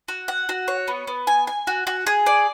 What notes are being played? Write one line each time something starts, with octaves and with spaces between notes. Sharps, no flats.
F#4
F#5
F#4
C#5
B3
B3
G#5
G#5
F#4
F#4
G#4
D5